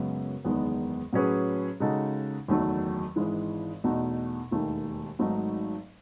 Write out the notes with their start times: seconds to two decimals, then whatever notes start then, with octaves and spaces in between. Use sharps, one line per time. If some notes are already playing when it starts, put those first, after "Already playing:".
Already playing: F#2 C#3 G#3 B3
0.45 F#1 E2 D#3 G#3 B3
1.13 A2 F#3 C#4 G#4 B4
1.80 C#3 G#3 D#4 F#4 A4
2.48 F#1 E2 D#3 F#3 A3
3.16 G#1 G#2 E3 G#3
3.84 E2 B2 A3 D#4 F#4
4.51 E1 D#2 D#3 A3
5.19 G#1 G#2 F#3 A3 D#4